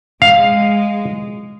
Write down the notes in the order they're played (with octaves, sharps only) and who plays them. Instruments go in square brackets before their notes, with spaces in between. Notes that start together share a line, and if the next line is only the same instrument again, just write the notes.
[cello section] G#3 [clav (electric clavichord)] F5